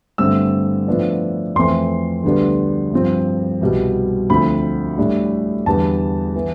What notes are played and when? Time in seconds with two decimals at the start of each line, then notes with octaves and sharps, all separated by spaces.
0.18 G2 D3 A3 C4 E6
0.88 A2 F3 B3 D4
1.56 F2 E3 A3 C4 C6
2.24 D2 D3 G3 B3 D4
2.93 G2 F3 C4
3.61 C2 B2 G3
4.30 D2 D3 F3 C4 B5
4.98 A2 G3 D4
5.66 E2 D3 G3 B3 A5
6.35 E3 B3